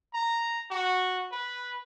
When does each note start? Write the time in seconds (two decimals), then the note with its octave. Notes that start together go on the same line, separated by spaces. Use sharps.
0.14 A#5
0.71 F#4
1.31 B4